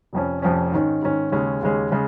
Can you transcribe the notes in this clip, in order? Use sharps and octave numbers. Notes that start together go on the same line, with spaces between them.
F1 F2 F3 C#4
F1 F2 F3 C#4
G#2 D#3 C#4
G#2 D#3 C#4
D#2 C#3 G#3 C#4
D#2 C#3 G#3 C#4
C#3 G#3 C#4